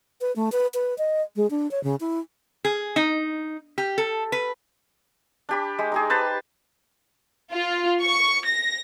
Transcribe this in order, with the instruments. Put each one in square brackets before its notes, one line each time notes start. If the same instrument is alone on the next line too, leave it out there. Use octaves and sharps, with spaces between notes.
[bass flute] B4
A3
B4
B4
D#5
G#3
D4
C#5
C#3
E4
[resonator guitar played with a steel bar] G#4
D#4
G4
A4
B4
[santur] D4 G4 B5
G#3
D#4 G4 G#4
B4 C5 A5
[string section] F4
C#6
A#6